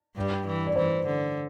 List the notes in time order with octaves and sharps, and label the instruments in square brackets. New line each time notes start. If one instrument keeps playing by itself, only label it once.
[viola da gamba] G2 G3
E3
[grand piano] D5
[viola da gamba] E3 [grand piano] C5
[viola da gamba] D3